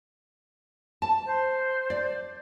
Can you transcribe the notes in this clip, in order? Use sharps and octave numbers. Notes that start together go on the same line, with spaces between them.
A5
C5
D5